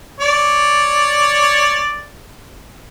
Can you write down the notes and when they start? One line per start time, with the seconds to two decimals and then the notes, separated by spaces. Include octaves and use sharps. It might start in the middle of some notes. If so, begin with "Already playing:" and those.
0.20 C#5 D5